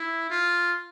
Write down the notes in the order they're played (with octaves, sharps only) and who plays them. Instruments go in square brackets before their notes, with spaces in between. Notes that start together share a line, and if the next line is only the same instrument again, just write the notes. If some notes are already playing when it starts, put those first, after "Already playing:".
Already playing: [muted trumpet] E4
F4